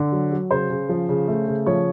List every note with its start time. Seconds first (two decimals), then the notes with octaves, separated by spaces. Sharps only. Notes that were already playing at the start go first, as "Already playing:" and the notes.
Already playing: D3
0.12 F#3
0.32 F#3
0.51 C#3 C5
0.70 C#3
0.89 F3
1.09 C#3
1.28 A3
1.48 C#3
1.66 F3 C#5